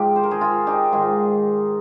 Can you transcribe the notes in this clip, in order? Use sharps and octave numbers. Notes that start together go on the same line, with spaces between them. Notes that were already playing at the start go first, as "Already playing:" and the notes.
Already playing: G#2 F3 F4 G4
C5
A#4
G#4 C5
F4 G#4
D#4 G4
G#2 D#3 F4 G#4